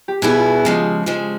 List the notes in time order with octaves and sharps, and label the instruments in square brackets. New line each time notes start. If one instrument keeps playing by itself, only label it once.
[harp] G4
[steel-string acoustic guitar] B2 G3 B3 E4 [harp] G#4
[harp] F4
F#4
[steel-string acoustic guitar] C#3 F3 G#3 [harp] G4
[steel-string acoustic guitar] C#3 F3 G#3